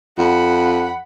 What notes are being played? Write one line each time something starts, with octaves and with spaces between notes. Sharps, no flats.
F2 F#5 B5